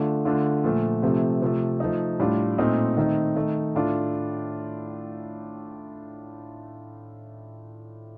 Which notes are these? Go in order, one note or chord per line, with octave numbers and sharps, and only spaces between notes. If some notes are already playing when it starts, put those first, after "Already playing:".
Already playing: D3 A3 D4 F4
D3 A3 D4 F4
A#2 F3 A3
C3 F3 A3 C4
C3 F3 A3
F3 A3 D#4
A2 G3 D4 F4
A#2 A3 C4 D#4
D#3 A3 C4 D#4
D#3 A3 D#4
A2 A3 D4 F4